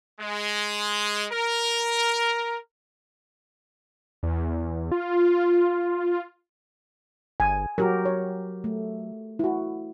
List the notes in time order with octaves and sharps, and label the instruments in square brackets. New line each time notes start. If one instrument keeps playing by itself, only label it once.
[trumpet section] G#3
A#4
[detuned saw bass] E2
F4
[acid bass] G1 [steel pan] G#5
[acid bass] F#3 [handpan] F#4 G4 A#4
[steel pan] C#5
[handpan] A3
[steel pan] E4 F#4